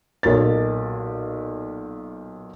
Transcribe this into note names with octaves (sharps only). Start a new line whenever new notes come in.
B1 A#2 A#3 A6